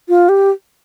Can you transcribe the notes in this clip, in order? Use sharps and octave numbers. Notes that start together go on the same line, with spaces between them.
F4
G4